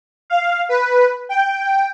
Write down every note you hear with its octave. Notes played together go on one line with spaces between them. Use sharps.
F5
B4
G5